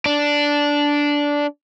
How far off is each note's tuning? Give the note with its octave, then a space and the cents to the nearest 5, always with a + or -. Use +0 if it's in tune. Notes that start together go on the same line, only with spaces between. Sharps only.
D4 -10